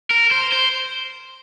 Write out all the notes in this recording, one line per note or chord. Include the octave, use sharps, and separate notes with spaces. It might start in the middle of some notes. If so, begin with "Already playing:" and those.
A#4
C5
C5